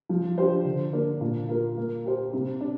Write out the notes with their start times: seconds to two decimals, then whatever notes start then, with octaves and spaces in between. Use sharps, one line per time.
0.09 F3
0.38 D4 G4 C5
0.65 D3
0.93 A#3 D4 A#4
1.21 A#2
1.49 A#3 F4 A#4
1.77 A#3
2.06 G4 C5
2.33 C3
2.61 D4